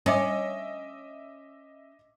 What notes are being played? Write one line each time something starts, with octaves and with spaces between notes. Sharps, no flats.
C#4 D#5 E5 D6